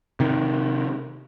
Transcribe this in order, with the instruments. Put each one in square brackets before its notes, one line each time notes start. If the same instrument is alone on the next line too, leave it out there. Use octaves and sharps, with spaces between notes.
[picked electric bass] C3 D#3